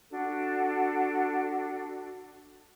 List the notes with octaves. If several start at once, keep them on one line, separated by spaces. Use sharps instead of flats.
D4 F#4 A4